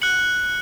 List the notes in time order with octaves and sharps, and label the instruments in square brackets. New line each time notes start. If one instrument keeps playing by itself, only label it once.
[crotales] F#6 C#7 F#7